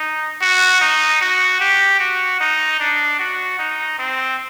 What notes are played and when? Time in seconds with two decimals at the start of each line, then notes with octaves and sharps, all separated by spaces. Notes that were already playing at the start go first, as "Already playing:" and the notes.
Already playing: D#4
0.42 F#4
0.81 D#4
1.21 F#4
1.60 G4
2.00 F#4
2.40 D#4
2.80 D4
3.20 F#4
3.59 D#4
3.99 C4